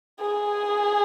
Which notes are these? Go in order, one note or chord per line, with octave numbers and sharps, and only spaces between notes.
G#4